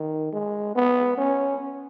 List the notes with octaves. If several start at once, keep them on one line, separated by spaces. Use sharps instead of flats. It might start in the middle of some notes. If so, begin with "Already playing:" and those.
Already playing: D#3
G#3
B3
C#4